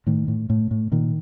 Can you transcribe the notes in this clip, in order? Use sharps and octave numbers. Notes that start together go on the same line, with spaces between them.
A2 D#3
A2
A2
A2
A#2 D#3